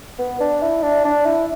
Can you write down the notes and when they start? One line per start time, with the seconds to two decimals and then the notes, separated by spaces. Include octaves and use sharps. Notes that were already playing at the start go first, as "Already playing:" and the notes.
0.19 B3
0.40 D4
0.62 E4
0.83 D4
1.05 D4
1.26 E4